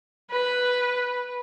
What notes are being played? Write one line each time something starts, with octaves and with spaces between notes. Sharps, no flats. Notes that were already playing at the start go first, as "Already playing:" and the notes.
B4